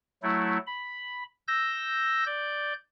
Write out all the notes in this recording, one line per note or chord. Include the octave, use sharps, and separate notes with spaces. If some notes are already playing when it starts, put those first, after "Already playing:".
F#3 A3 E4
B5
E6 G6 A#6
D5 G6